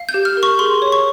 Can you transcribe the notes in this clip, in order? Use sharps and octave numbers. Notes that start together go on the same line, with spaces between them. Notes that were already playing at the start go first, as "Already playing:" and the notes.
Already playing: F5
G6
G4
F6
A#4
C#6
G#4 C6
C#5
C#6